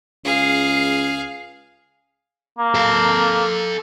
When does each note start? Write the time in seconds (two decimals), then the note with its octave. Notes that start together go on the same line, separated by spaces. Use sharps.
0.25 C#2 G#4 F5
2.59 A#3
2.75 A4 F5